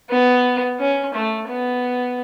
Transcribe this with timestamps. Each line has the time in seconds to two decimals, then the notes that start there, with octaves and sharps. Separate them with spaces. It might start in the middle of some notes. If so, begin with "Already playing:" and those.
0.10 B3
0.79 C#4
1.14 A3
1.48 B3